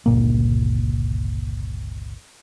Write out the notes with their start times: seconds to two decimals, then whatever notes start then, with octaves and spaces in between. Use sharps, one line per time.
0.06 G1 C#2 A#2 A#3